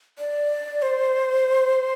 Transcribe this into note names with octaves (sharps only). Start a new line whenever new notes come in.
D5
C5